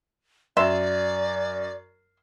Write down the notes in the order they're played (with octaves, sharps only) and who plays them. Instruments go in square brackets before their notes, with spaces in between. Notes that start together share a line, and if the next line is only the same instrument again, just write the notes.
[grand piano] F#2 [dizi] D5 [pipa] E5 C6